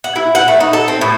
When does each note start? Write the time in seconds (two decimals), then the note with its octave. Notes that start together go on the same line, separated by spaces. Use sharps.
0.04 F#5
0.16 E4
0.35 F#5
0.48 A3
0.60 D#4
0.73 A4
0.88 C4
1.01 A2